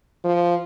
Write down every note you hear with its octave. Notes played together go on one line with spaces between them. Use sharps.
F3